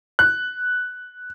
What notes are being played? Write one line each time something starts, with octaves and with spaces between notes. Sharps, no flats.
F#6